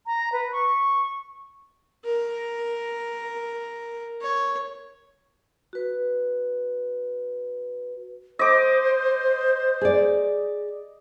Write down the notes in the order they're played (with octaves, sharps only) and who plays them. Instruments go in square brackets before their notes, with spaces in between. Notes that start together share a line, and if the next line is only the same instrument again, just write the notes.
[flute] A#5
B4
C#6
[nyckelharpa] A#4
C#5
[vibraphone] F#4 B4
[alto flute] C5 [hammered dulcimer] D#5 D6
[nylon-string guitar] G#4 D5